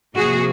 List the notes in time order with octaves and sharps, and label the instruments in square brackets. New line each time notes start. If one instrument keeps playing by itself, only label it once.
[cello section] C3 F3 A#3 F#4 G#4